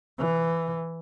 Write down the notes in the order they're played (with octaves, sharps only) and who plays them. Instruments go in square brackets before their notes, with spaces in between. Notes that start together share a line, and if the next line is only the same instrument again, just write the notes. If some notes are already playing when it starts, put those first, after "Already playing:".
[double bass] E3